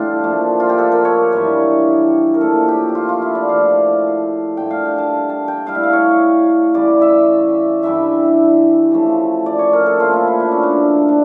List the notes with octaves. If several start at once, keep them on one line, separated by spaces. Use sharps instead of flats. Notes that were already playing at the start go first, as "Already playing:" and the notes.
Already playing: A2 E3 G3 D4 F4 G4 A4
A#2 F3 A3
F4
G4
A4
A#4
C#5
G2 E3 G3 C#5
A#4
A#2 F3 A3 A4
G4
G4
F4
F4
E4
D5
A2 F3 A3 F5
G2 D3 A3 G5
F5
G5
A5
A5
G5
A2 G3 F5
E5
F5
C#5
C#3 E3 G3 D5
E5
G2 E3 G3 E5
C#3 F3 A3
D5
C#5
A#4
A4
A#2 F3 A3 F4
E4
E4
D4
C#4
D4
F3 A3 D4